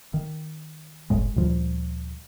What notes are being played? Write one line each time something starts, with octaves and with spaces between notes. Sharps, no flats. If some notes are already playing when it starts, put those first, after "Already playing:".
D#3
F#1 C2 A2 G#3
D2 A#2 F3 G3